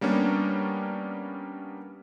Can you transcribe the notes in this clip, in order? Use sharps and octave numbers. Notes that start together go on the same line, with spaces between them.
G3 A#3 B3 C#4 D4